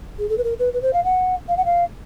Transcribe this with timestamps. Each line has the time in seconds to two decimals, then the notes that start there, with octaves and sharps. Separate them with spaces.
0.18 G#4
0.29 A4
0.37 B4
0.44 A#4
0.59 B4
0.73 B4
0.82 C5
0.93 F5
1.04 F#5
1.48 F5
1.57 F#5
1.65 F5